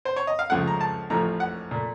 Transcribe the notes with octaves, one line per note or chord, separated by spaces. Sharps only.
C5
C#5
D#5
F5
C#2 C#3 F3 A3 F#5
A#5
A5
A1 A2 F3 A3 A#5
F#5
A#2 A3